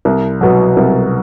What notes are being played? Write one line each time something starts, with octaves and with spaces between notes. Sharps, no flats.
C2
B2 F#3
C2